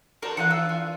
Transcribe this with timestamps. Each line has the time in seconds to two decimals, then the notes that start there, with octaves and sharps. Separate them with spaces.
0.22 D4 F#4 A4 A#4 C5 A5
0.37 E3 D4 F4 F#5 G#5 F#6
0.50 E6
0.69 G#5